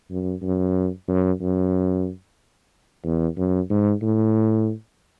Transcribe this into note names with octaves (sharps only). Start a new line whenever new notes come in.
F#2
F#2
F#2
F#2
E2
F#2
G#2
A2